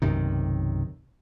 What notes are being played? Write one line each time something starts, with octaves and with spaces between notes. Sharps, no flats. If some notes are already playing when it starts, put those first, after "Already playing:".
B1 F#2 C3 D#3